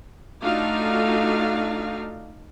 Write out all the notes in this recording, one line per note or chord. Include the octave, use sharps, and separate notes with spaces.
A3 D4 D#4 F4 F#4 F5